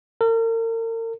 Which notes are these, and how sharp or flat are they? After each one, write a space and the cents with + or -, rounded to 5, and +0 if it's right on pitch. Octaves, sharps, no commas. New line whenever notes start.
A#4 -40